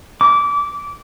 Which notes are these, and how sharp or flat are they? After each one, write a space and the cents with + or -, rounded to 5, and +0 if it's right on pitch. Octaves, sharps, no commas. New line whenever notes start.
D6 -20